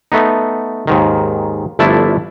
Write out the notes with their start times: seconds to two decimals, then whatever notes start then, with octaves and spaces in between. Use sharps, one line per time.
0.12 A3 B3 D#4
0.87 D#2 G#2 D#3
1.79 G1 F3 A3 D4 E4 A5